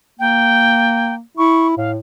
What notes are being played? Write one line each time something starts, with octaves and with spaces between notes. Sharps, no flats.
A#3 G5
E4 C#6
A2 F5